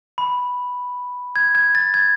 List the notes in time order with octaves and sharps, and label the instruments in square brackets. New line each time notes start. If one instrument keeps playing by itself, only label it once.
[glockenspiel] B5
G#6
G#6
A6
G#6